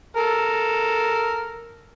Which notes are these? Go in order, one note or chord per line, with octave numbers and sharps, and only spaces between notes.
A4 A#4